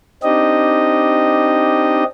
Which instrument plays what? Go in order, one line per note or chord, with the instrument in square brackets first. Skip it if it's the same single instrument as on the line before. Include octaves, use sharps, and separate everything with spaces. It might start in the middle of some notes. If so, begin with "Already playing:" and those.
[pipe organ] C4 D4 D#4 G4 D#5